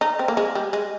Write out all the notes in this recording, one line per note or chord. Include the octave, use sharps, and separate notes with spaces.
D#4
C4
A#3
G#3
G3
G#3